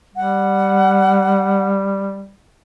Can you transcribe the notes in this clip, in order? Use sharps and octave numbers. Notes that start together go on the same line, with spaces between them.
G3 F#5